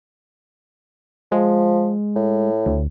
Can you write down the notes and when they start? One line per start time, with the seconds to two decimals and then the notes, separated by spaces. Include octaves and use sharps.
1.32 F3 G#3
2.16 A2
2.66 D2